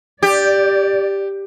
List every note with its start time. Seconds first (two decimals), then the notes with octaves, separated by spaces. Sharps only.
0.23 G4 D5